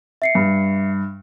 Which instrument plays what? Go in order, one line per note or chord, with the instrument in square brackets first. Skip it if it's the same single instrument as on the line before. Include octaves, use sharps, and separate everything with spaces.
[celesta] E5 C7 C#7
[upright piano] G2